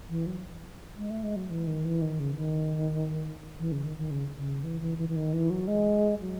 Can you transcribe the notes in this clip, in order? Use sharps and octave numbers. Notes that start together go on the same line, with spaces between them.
E3
F#3
G#3
A3
G#3
F#3
E3
D#3
E3
D#3
C#3
D#3
E3
C#3
D#3
D#3
C#3
C#3
E3
E3
E3
E3
D#3
E3
F#3
G#3
F#3